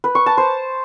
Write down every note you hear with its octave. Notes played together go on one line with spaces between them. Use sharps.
B4
C#6
A5
C5